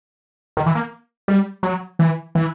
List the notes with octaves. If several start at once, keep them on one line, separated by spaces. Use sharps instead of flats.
D#3
E3
A#3
G3
F#3
E3
E3